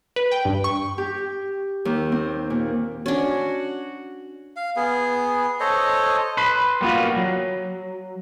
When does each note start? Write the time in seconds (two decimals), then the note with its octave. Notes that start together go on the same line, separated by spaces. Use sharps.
0.16 B4
0.31 G5
0.45 G2
0.64 C#6
0.98 G4
1.85 D#2
2.12 C4
2.50 A#2
3.06 C#4 D4 F#4
4.56 F5
4.76 B3 G#4
5.60 A4 C5 C#5 D#5
6.37 B4 B5 C6
6.81 G3 A#3 B3 F4 F#4
7.16 F#3